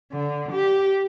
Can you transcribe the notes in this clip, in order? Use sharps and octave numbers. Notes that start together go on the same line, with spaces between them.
D3
G4